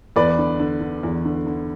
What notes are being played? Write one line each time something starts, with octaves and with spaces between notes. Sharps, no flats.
E2 B4 D5
D3
D3
D3
E2
D3
D3